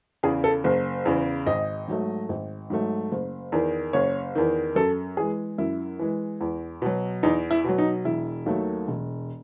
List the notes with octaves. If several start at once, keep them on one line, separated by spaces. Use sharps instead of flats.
E2 C#3 G#4
A4
F#1
E2 C#3
G#1 D#5
G#2 F#3 A3
G#1
G#2 F#3 A3
F#1
E2 D#3
F#1 C#5
E2 D#3
F#2 A4
E3 G#3 G#4
F#2 E4
E3 G#3
E2
B2 F#3
E2 D#4
E4
B2 F#3
D#4
E1 E4
D#2 D#3 F#3 A3
E1